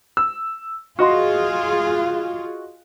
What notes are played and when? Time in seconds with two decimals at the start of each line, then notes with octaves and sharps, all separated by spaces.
0.17 E6
0.99 F4 F#4 G#4 D#5 C6